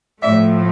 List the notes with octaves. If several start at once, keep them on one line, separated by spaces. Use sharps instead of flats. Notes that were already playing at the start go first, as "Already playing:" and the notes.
A2 F3 A3 D5 E5